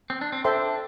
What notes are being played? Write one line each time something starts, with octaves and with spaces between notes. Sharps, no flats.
C4
D4
C4
D4 A4 C5 E5 G5 C6